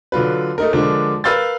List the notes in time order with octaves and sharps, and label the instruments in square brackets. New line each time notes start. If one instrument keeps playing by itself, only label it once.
[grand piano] D3 F#3 F4 B4
A3 D#4 A#4
D3 F3 G#3 D4 A#4 D5
A#4 B4 F5 E6 G6 A6